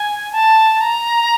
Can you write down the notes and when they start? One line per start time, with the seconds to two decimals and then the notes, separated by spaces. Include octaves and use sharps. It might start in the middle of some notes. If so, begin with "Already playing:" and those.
Already playing: G#5
0.32 A5
0.81 A#5